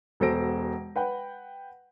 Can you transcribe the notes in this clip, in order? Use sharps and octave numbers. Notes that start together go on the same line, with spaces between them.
E1 B2 A4 C5 A#6 D7
B4 F#5 G5